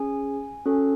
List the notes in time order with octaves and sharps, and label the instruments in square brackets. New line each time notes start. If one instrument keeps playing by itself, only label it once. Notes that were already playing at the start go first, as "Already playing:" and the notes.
Already playing: [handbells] C#4 G#4 G#5
C#4 F#4 A4